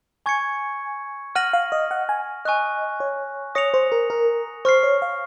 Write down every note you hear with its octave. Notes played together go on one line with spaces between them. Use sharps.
G#5 C#6 G#6 C#7
F#5 F6 A#6 D#7 F#7
F5
D#5
F#5
G#5
D#5 G#5 C#6 F#6
C#5
C#5 D#6 A#6 C#7 F7
C5
A#4
A#4
C5 C#6 F6 C7
C#5
F5